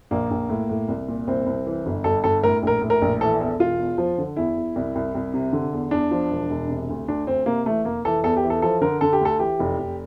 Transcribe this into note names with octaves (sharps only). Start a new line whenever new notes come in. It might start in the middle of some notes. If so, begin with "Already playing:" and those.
A#1 A#3
A#1
A2
A2
C2
A#2
C2 C4
C2
E3
G1
G1 A4
G1 A4
A2 A#4
A#1 A#4
A2
A#4
A#1
E3 A4
E2 A4
E1 F4
E2
F3
D3
E2 E4
E2
C2
C2
C2
C3
D3
E2
E2 D4
F3
E1
E1
C3
D2
D2 D4
D2 C4
C3 A#3
E3 A3
F1 A#3
E3 A4
E2 A4
G4
E3
A4
F3 A4
D3 A#4
D3 A4
G4
D2 A4
E3 G4
F1
F1